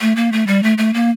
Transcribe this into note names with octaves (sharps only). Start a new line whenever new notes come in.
A3
A#3
A3
G3
A3
A3
A#3